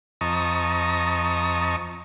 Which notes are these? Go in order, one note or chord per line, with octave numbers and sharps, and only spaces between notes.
F2 D#5 A5 A#5 C#6 D#6